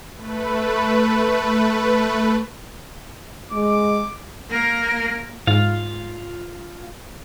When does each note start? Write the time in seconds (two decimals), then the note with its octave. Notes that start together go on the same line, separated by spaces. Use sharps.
0.16 A3 B4
3.52 G#3 D6
4.51 A#3 A#4
5.47 G#2 F4 F5